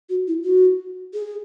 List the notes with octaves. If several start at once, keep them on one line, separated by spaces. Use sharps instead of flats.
F#4
E4
F#4
G#4